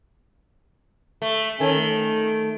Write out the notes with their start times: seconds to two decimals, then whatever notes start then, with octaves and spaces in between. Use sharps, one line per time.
1.22 A3
1.60 D#3 C#4 A4 G#5
1.76 A3